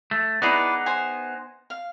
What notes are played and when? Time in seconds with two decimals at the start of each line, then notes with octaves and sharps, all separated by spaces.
0.11 A3
0.42 B3 D#4 E4 G#4 B4 D5
0.86 C5 G#5
1.70 F5